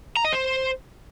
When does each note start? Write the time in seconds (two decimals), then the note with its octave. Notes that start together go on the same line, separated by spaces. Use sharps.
0.16 A#5
0.25 D#5
0.33 C5